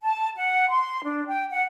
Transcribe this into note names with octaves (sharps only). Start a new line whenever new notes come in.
A5
F#5
C6
D4
G5
F#5